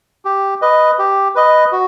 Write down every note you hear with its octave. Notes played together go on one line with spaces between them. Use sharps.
G4
B4 D#5
G4
B4 D#5
F#4